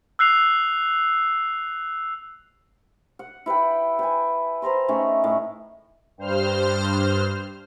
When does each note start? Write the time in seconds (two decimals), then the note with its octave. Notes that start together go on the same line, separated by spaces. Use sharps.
0.19 E6 F#6 C7 F7
3.19 F#5
3.46 E4 B4 F#5 G5
3.99 B4 G5 G#5
4.62 B4 C5 A#5 C6
4.88 A3 C#4 D#4 G#4
5.24 A2
6.18 G2 C5 F6